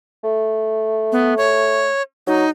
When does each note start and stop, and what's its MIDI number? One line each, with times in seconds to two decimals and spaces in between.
0.24 1.90 57
1.12 1.34 59
1.38 2.02 73
2.27 2.45 54
2.27 2.49 63